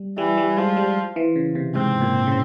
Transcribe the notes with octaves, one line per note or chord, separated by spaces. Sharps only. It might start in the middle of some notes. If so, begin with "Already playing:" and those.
Already playing: G3
E3 G3
G3
F3 G#3
G3
E3
C#3
C3
G#2 C4
A#2
C#3